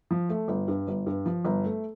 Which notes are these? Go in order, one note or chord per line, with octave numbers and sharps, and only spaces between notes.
F3
A3
G1
G2
G1
G2
F3
G1
A3